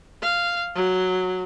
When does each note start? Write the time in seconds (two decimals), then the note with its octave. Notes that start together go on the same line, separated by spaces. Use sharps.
0.22 F5
0.75 F#3